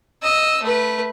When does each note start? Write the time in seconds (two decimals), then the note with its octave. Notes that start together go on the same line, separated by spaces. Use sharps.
0.22 D#5 E6
0.62 A3 B4